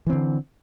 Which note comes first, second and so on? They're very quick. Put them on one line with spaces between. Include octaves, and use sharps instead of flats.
E3 C4 D3